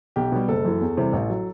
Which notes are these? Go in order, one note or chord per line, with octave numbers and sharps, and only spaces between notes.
B1 G4
B2 G3
F#1 A4
F#2 E3
E2
C3 E3 G3
A1
F#3